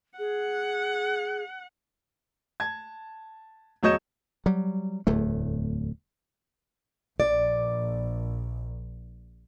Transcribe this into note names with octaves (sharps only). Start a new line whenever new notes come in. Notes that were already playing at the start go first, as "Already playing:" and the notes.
G#4 F#5
A5 G#6
E1 F#3 C#5 D#5 G6 E7
F#3 G3
D1 E2 A3
A#1 D5